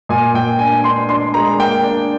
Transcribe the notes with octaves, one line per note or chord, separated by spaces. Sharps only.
A#2 G#5
A#2 G5
D4 G#5
D4 C6
D4 C6
G#3 A#5
A#3 G5
D4